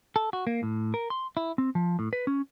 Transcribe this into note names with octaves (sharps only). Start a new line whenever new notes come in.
A4
F#4
A#3
A2
A#4
C6
E4
C4
F3
A2
B4
C#4